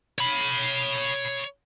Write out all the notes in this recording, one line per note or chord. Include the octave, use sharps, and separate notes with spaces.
C#5 B5